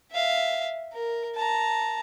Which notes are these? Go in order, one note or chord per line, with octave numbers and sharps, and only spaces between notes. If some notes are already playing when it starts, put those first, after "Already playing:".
E5 F5
A#4
A5 A#5